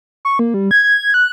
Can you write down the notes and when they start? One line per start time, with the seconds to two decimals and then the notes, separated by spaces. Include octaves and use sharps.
0.25 C#6
0.39 A#3
0.54 G3
0.71 G#6
0.84 G#6
0.99 G#6
1.14 F#6